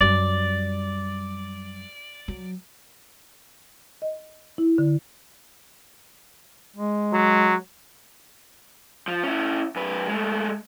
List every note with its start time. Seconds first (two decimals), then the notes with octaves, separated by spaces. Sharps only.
0.01 F#2 G3 D5
2.28 F#3
4.02 D#5
4.58 E4
4.78 D3
6.76 G#3
7.13 F#3
9.08 F3
9.23 C#4 E4
9.76 F#2 B4
10.08 G#3 A3